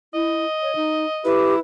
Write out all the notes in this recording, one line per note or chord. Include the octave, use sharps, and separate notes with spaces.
E4 D#5
C#5
D#4
E4 G4 B4